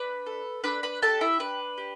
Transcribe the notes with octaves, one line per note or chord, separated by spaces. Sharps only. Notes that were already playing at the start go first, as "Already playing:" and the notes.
Already playing: D4 B4 B5
A4
D4 B4 B5
B4 B5
G4 A4 A5
E4 E5
D4 B4
G4